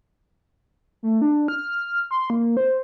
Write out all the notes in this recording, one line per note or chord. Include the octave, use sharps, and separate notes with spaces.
A3
D4
F6
C6
A#3
C5